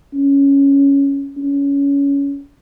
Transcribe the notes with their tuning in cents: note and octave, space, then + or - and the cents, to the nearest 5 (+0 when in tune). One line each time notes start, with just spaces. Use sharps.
C#4 +5
C#4 +15